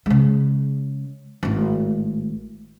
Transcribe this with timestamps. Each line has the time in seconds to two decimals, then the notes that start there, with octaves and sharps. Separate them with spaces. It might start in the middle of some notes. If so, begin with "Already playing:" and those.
0.06 C#3 G#3
1.43 G#1 A2